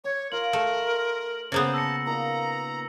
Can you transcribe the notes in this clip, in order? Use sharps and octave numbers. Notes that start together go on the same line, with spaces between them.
C#5 D6
F4 A#4 F#7
A3
C#3 A#3 B3 C5
A5 E6 A#6 C#7
A#2 D#4 B4 A#5